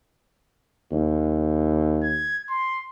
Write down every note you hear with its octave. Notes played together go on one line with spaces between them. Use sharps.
D#2
G#6
C6